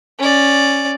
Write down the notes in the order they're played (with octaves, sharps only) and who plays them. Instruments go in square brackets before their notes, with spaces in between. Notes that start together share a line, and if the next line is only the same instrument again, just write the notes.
[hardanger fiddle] C#4 D5